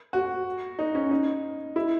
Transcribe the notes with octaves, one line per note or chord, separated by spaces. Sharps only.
F#4
D#4
C#4
D#4
E4